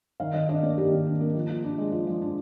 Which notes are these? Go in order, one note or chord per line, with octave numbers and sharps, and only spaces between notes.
D#3 F5
D#3 D#5
D4 D#5
A#3 D5
D#3 G4
D#3
D4
A#3
F3
F3
D4
G#3
F3
F3
D4